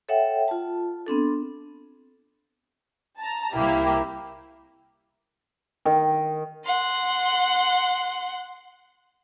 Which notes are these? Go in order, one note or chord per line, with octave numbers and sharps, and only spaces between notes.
A4 C#5 E5 F#5 G5
F4 A5
B3 C4 D4 A4
A5 A#5
C2 A#3 E4 G4
D#3
F#5 C6